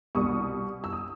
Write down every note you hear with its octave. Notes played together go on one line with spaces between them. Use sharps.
C2 B2 G3 C#6 D#6
E6
D#6